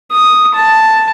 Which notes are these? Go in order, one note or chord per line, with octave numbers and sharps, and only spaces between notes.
D#6
A5